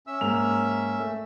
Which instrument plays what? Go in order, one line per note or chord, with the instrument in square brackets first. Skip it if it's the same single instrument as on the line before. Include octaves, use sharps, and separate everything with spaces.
[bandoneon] C#4 E5 E6
[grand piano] G#2 A#3 F7
A3